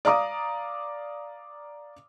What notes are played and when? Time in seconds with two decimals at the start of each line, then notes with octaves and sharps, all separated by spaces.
0.05 D5 F5 A#5 D6 D#6